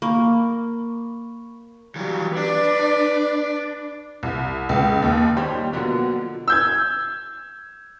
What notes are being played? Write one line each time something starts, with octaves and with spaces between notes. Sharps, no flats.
A#3 B5 C#6
E3 F#3 G3
D4 B4 D5
C2
C#2
D#2
D#3 G3 A#3 G4 C5 C#5
B2 D3 F3 F#3 A#3 B3
E6 G6 G#6